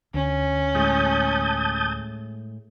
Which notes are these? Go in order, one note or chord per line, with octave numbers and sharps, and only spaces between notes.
D2 C#4
A2 G#3 A5 D#6 G6